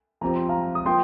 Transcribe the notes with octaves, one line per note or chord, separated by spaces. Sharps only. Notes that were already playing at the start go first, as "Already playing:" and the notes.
F2 F3 C4 G4 A#5
C6
F5 A#5
D#6
F3 A#3 G5 C6